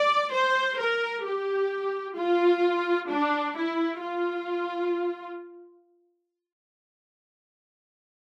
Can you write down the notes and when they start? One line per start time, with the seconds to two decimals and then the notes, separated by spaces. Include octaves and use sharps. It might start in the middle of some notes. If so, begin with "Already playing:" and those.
Already playing: D5
0.33 C5
0.79 A#4
1.25 G4
2.17 F4
3.10 D4
3.57 E4
4.02 F4